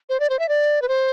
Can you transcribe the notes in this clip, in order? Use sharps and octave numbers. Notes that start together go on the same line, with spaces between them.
C5
D5
C5
E5
D5
B4
C5